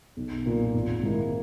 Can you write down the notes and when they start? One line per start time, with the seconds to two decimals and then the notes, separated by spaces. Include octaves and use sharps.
0.17 B1
0.46 A#2 A#3
0.74 G#1
1.03 G#2 D#3 A#3 E4